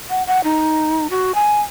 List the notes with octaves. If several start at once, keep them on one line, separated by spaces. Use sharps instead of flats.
F#5
F#5
D#4
F#4
G#5